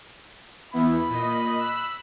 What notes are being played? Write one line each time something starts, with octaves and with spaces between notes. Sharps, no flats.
E2 B3 E4 B5
A#2 D#5
E6 F#6 B6